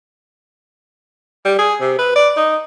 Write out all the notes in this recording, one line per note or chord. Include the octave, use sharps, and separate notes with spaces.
G3
G#4
C3
B4
D5
D#4